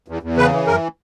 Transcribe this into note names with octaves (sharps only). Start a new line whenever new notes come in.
E2
E2
C#3 B4
E3
F#2 A#4